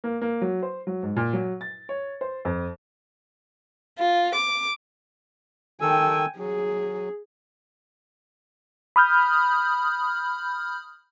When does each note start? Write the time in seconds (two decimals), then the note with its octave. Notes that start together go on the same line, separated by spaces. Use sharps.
0.04 A#3
0.22 A#3
0.42 F#3
0.63 C5
0.87 F#3
1.03 G#2
1.17 A#2
1.33 F#3
1.61 A6
1.89 C#5
2.21 C5
2.45 F2
3.99 F4
4.35 D6
5.81 D#3 A4 G5 G#5 E6
6.39 F#3 G#4
8.96 B5 D#6 F6 G6